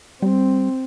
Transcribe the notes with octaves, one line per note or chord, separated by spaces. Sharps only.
G3 C4